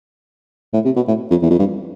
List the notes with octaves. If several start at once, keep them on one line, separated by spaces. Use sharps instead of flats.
A2
C3
B2
A2
F2
E2
F2
G2